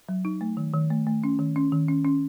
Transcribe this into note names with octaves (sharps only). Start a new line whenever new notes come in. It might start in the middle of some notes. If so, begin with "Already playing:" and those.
F#3
D#4
A3
D#3
D#3
A3
A3
C#4
D#3
C#4
D#3
C#4
C#4